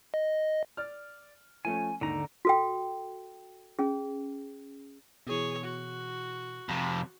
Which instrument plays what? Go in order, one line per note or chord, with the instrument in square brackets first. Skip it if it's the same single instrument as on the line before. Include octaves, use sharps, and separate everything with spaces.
[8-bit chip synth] D#5
[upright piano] D5 F6
[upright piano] F3 A3 C#4 [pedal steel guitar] G#5
[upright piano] D#2 G#2 [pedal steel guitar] D3 A#5
[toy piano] F#4 A4 G5
C#4 G#4
[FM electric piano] B2 E3 [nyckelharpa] G#4 C#5
[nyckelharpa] F#4
[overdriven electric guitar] F2 C3